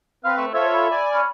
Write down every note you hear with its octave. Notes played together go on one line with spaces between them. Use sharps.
C4 B4 F5 C6
A3
F4 A4 C5 C#5 E5
B5
D5 G#5
C#4 B5